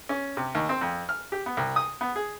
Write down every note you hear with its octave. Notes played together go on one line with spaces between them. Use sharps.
C#4
C3
D#2
C4
F2
F6
G4
B3
C2
D#6
B3
G#4